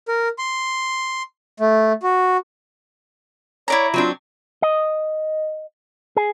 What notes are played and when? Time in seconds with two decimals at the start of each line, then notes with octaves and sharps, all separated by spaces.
0.08 A#4
0.39 C6
1.60 A3
2.03 F#4
3.68 E4 C#5 D5 A#5
3.94 F#3 C4 D4 F4
4.62 D#5
6.17 G#4